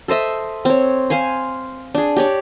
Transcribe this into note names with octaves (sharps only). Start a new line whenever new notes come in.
A4 C5 D#5 E5
C4 C#5
C5 F5 G#5 C6
D4 G#4
G4 C#5 D5